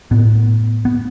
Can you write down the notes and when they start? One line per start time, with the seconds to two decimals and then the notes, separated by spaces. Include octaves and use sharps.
0.11 A2 B3
0.85 B3